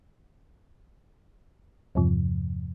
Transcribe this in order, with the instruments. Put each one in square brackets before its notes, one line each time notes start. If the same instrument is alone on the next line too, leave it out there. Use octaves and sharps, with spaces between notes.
[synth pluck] E2 G2 C3 F3